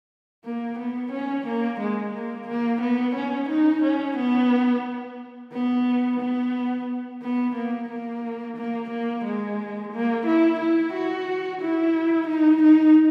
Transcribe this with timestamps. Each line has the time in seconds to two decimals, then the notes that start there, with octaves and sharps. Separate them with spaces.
0.45 A#3
0.79 B3
1.12 C#4
1.47 A#3
1.80 G#3
2.14 A#3
2.48 A#3
2.81 B3
3.16 C#4
3.49 D#4
3.83 C#4
4.17 B3
5.52 B3
6.20 B3
7.22 B3
7.55 A#3
7.89 A#3
8.57 A#3
8.90 A#3
9.25 G#3
9.93 A#3
10.26 E4
10.60 E4
10.93 F#4
11.62 E4
12.28 D#4
12.63 D#4